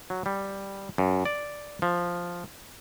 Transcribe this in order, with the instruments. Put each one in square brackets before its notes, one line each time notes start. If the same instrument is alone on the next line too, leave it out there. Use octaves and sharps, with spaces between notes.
[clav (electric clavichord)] F#3
G3
F#2
D5
F3